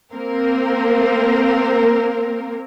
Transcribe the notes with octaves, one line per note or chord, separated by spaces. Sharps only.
A#3 C4 A#4